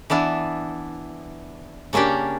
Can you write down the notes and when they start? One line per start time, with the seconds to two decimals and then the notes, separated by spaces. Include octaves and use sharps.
0.10 E3 B3 D4 E4
1.93 C#3 A#3 C#4 D4 G4